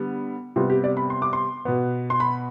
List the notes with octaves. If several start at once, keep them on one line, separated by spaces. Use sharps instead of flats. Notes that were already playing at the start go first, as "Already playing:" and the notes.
Already playing: D3 G3 B3
C3 G3 B3 F4
G4
D5
B5
C6
D6
C6
B2 B3
C6
B5